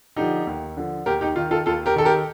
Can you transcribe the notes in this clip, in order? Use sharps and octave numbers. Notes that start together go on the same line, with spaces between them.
D3 F3 D#4 G4
D#2
D3 F3
D#2 G4 A#4
D#4 G4
D#3 F4
F4 A4
D#2 F4 A4
G4 A#4
D#3 A4
G4 A#4